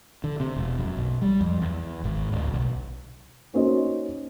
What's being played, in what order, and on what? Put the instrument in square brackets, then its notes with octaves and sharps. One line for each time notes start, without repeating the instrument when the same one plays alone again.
[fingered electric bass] D3
C3
E1
F#2
B1
G3
F2
E2
G#1
D1
B1
[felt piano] A#3 C#4 D#4 F#4 C5 D#5